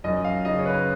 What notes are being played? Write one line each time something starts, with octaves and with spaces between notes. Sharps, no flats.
F#2 D#5
F5
C#3 D#5
C#5
B4